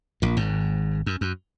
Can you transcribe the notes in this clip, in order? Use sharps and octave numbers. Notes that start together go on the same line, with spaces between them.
A#1 A#2
G#1 G#2
F#2
F#2